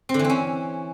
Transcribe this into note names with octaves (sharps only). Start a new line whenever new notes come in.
C4
D3
E3
C4
C#4